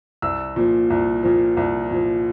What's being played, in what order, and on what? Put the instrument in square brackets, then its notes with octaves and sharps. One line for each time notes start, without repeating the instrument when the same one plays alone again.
[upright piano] C2 E6
A#2 F3
C2
A#2 F3
C2
A#2 F3